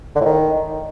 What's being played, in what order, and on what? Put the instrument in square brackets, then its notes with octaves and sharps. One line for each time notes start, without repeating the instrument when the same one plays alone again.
[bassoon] D3
A2
D#3